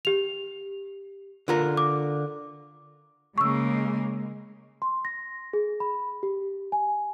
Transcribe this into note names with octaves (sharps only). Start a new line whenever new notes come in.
G4 F7
D3 F4 A#4
D6
C#3 G#3 A#3 C#6 E6
C6
A#6
G#4
B5
G4
G#5